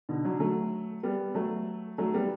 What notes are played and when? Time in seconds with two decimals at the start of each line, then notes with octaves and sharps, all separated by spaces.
0.09 B2 D3
0.25 D3 F#3
0.40 F#3 A3
1.03 G3 B3
1.35 F#3 A3
1.98 F#3 A3
2.14 G3 B3